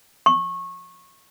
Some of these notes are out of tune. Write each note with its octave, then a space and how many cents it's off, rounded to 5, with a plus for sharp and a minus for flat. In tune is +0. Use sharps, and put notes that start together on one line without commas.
C#6 -20